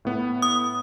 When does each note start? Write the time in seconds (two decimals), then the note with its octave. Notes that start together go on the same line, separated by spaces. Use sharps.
0.05 A2 B3
0.42 D#6